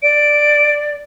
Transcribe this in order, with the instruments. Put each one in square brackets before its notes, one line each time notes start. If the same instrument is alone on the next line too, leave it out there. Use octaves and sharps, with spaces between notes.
[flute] D5 [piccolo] D7